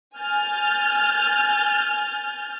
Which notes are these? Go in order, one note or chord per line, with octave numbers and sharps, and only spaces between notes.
G#5 F6 G6 A6